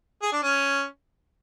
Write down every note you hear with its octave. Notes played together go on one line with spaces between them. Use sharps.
G#4
D4
C#4